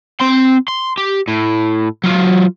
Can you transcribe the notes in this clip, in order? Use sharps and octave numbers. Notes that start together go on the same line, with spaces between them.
C4 C6
C6
G4
A2
F#3 F4